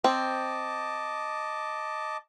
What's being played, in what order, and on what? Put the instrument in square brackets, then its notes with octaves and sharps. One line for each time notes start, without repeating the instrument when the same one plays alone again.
[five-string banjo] C4 [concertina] D#5 A5 D6